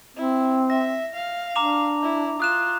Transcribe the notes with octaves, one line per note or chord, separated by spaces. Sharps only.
C4 E4
E5 A#6
F5
D4 A#5 D6 F7
E4
F4 D#6 F#6 E7